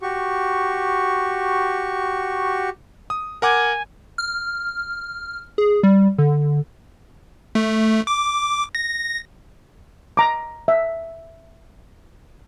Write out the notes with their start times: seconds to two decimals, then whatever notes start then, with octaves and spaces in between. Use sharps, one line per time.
0.02 F#4 G4 C#6
3.10 D#6
3.42 A#4 F#5 G#5 D6
4.18 F6
5.58 G#4
5.83 G3
6.18 D3
7.55 A3
8.07 D6
8.75 A#6
10.17 A#5 D6
10.68 E5